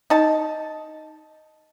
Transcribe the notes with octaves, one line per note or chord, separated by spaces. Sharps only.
D#4 A5